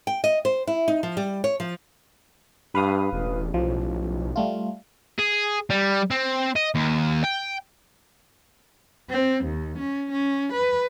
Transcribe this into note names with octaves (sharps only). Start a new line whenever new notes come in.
G5
D#5
C5
E4
D#4
F3
G3
C#5
F3
G2 B4 F5 D#6
E1 A1
B1 F3
G3 A3 F4
G#4
G3
C4
D#5
D#2
G5
C4
D#2
C#4
C#4
B4